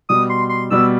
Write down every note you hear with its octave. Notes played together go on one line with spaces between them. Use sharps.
B2 G3 B3 F#4 D#6
C6
C6
B2 G3 B3 F#4 E6